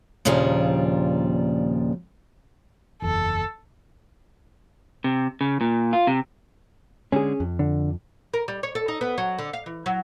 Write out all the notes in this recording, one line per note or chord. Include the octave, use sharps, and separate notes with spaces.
D#2 A#2 C#3 F3 G3 D4
F#1 E2 A4
C3
C#3
A#2
F4
C3
D3 G#3 C#4 G#4
F2
D3
A#4
G3
C#5
A4
D#4
B3
F#3
D3
F5
E3
F#3